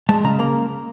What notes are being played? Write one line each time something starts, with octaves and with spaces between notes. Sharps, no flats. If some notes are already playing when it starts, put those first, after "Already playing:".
G#3 A5
C#3 A#5
A#3 A#5